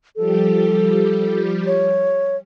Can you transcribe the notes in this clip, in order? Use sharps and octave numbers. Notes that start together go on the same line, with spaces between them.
F3 G3 G4 A4
C#5